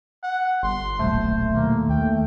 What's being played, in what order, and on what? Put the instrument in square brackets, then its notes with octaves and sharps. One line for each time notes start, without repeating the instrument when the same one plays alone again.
[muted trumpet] F#5
[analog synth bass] G1 [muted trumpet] C6
[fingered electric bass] D#1 B1 [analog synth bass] A3 [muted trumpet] C5
[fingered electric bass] D#2 [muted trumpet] A#3
[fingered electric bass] D#2 [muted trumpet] G5